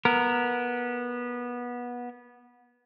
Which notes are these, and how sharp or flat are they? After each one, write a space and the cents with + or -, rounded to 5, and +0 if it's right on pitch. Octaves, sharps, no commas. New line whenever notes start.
B3 -20 A#4 -10